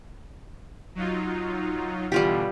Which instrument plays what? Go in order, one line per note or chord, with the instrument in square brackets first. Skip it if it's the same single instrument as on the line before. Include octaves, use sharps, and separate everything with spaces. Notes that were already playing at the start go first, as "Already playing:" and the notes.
[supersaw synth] F#3 D#4 F4
[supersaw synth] B2 D3 E3 [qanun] G3 F4 G4